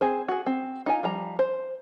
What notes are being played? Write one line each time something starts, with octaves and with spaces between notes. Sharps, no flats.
C4 G#4 C5
F#4 G#4
C4
D#4 F4 G#5
F3 G3 A#5
C5